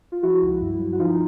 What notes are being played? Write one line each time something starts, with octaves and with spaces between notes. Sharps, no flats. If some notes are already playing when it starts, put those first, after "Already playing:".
F4
F3 E4 F#4
C#2
G2
F#3
F#4
F3 D#4 F4